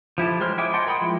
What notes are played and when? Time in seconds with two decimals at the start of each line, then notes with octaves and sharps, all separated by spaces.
0.18 F3 E4 G4 A4
0.40 F#3 G#3 C5 F6
0.58 E4 G#4 E5 G5 D6
0.73 D#5 F#5 G5 A5 C6
0.87 A#4 G5 B5 C6 D#6
1.01 F3 G#3 E4